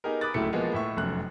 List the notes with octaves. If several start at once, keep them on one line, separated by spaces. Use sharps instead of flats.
B3 D#4 G4 G#4 A#4
B5 D6 D#6 F#6 A6
D1 C#2 A3 E4 C#7
E3 F3 G#3 A#3 B3 G#4
A2 E5 C#6
F1 F#2 F#6